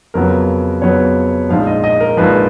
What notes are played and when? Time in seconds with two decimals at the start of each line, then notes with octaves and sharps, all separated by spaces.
0.14 F2 C#3 F#3 B3 A#4
0.82 F2 C#3 F#3 B3 C#5
1.49 A#1 G#2 F3 F5
1.67 D#5
1.84 D#5
2.00 A#4
2.17 A#1 G#2 F3 B4